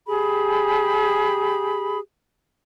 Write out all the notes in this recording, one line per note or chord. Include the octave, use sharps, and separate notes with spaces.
G4 G#4 B5